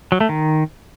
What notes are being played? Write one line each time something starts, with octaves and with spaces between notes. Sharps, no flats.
F#3
A3
D#3